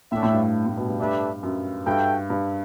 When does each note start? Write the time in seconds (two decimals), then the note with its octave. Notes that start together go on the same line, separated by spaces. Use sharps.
0.12 A2 A3 D4 A4 C#5 E5
0.23 A2
0.33 G2
0.66 A2
0.77 B2
0.88 G2
0.99 A3 D4 G4 B4 E5
1.43 F#2
1.86 G2 F#4 A4 E5 G5
2.30 G2